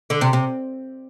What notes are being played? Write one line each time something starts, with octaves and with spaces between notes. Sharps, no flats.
D3
C3
C3